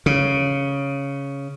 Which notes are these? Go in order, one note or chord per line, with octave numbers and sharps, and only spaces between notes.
C#3